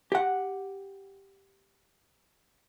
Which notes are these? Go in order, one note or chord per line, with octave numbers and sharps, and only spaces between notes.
G4 F#5